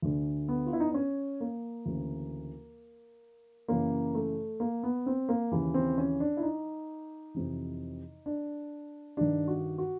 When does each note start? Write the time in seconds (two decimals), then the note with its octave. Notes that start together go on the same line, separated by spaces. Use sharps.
0.02 D2 D3
0.48 B3
0.66 F4
0.73 E4
0.80 D#4
0.87 D4
0.94 C#4
1.41 A#3
1.86 D2 C#3 E3
3.68 F#2 C#3 E3 A#3
4.15 A3
4.60 A#3
4.83 B3
5.06 C4
5.29 A#3
5.52 D#2 C#3 E3
5.74 C4
5.98 C#4
6.20 D4
6.37 E4
6.43 D#4
7.34 F2 C3 E3
8.26 D4
9.17 G2 D#3 D4
9.48 F#4
9.78 F#4